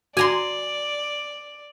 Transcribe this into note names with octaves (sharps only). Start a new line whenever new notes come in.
F#4 D5 G#5 A#5 C6